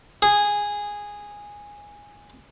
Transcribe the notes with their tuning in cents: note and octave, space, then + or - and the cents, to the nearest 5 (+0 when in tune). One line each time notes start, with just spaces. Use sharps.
G#4 -10